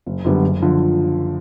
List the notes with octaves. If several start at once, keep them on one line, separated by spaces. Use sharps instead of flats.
F#1
F#2 D3 G3 B3
F#1
D3 F3